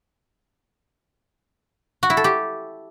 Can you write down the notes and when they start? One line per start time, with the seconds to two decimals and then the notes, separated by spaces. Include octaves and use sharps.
2.03 F#4
2.10 E4
2.17 A4
2.24 G4